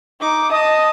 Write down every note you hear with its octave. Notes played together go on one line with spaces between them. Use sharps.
D#4 D6
D#5 A5 D#6